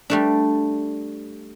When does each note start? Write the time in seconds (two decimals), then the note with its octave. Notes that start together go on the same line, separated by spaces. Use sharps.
0.10 G3 A3 D4